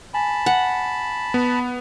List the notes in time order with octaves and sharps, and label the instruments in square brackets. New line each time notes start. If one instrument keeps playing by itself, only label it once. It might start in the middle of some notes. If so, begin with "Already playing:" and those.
[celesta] G#5 [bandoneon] A5 B5
[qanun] F#5
[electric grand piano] B3